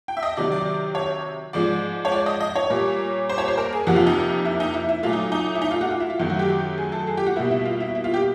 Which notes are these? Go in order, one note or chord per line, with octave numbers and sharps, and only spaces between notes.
G5
E5
D#5
C3 D#3 F#3 D5
D5
C#5
G#2 F3 G#3 D5
C#5
D5
D#5
D#5
C#5
A#2 G3 A#3
C5
C#5
C5
A#4
G#4
F2 C3 F3 A#3 F#4
F4
D#4
E4
D#4
E4
E4
A#2 F#3 A3 F4
D#4
D#4
E4
D#4
F4
F#4
F4
E4
F4
F#2 D#3 F#3 A3 E4
F#4
G4
G#4
A4
G#4
G4
F#4
B2 G3 A#3 E4
E4
F4
E4
E4
F4
G4